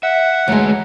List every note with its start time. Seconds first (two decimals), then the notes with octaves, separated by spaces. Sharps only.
0.03 E5 F#5
0.48 D2 E3 G#3 C#5 A#5